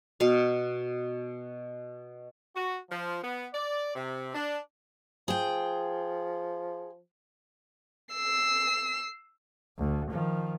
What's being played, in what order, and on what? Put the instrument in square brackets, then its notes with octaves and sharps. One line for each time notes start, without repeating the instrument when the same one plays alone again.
[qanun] B2 F5
[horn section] F#4
F3
B3
D5
C3
D4
[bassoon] F3 [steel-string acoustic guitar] G#4 G5
[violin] E6 C7
[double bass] D2
D#3 F3